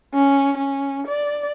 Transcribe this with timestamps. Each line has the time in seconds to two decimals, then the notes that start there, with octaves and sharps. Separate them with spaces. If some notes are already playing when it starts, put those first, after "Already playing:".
0.14 C#4
0.57 C#4
1.07 D5